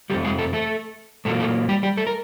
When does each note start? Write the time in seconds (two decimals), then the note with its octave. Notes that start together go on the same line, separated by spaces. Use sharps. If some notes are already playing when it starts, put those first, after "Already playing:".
0.10 F2 C3 F3 G3 A3 G4
0.24 G#3 G#4
0.39 A3 A4
0.53 A3 A4
1.25 A#2 F#3 A3 A#3 A4
1.40 A3 A4
1.69 G3 G4
1.83 G3 G4
1.97 A3 A4
2.07 A#4